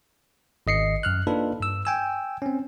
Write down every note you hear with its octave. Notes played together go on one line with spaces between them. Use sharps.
G#1 D#5 C7 C#7
F#2 F6 F#6
A#3 D4 D#4 F4 A4 B4
G2 E6
G5 G#5 E6
C4 C#4